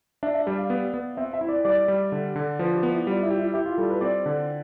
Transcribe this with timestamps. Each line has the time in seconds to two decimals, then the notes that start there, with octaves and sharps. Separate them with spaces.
0.23 D4 E5
0.35 E5
0.47 G3 D5
0.58 F5
0.70 B3
0.94 B3
1.17 C4 E5
1.33 E5
1.41 E4
1.49 D5
1.65 G3 D5
1.88 G3
2.12 D3
2.36 D3
2.59 F3 B4
2.75 G4
2.83 B3
2.91 E4
3.06 G3 F4
3.23 E4
3.31 G4
3.39 E4
3.53 E4 G4
3.66 F4
3.77 G3 A4
3.90 B4
4.01 C4 D5
4.26 D3